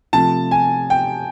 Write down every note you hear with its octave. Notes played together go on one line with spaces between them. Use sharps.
C3 F3 A3 A5
G#5
G5